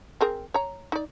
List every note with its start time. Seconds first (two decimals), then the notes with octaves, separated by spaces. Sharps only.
0.21 C4 G#4 A#4
0.54 C#5 A#5
0.92 D#4 D5